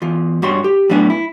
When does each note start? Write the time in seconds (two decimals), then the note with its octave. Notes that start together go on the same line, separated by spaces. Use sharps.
0.02 E2 F4
0.42 G2 F#4 C#5 C6
0.64 G4
0.90 A2 F#3 B3 D4 D#5 G#5
1.10 E4